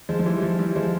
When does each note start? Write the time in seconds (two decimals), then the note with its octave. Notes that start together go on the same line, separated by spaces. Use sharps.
0.09 F3 G#3
0.19 F3
0.25 E3 G3
0.42 F3
0.59 E3 G3
0.76 F3 G#3